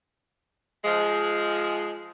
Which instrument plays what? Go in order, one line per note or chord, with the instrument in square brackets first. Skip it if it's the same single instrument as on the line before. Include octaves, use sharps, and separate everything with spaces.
[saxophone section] F3 G#3